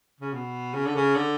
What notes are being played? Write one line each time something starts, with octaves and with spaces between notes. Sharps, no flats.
C#3
B2
C#3
D3
C#3
D3